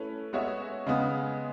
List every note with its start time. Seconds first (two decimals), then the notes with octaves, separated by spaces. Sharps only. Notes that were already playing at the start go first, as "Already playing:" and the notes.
Already playing: A3 C#4 E4 B4
0.33 G#3 B3 F#4 C#5 E5
0.87 C#3 G#3 B3